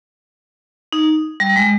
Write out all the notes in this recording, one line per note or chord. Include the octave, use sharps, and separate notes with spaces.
D#4
G3
G#3